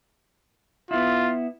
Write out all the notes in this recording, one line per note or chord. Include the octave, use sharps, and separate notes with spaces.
B3 E4 F4